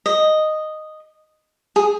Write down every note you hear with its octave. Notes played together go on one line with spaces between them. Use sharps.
D#5
G#4